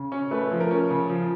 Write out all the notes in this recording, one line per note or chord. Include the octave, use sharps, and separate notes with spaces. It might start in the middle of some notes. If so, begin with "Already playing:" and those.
Already playing: C#3
C#4
A3 B4
F3
A#4
C#4
C#3
F3